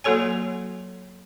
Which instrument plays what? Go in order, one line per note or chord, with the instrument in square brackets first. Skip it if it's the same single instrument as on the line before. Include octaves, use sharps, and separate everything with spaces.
[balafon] F#3 A#3 F#4 A4 C#5 G#5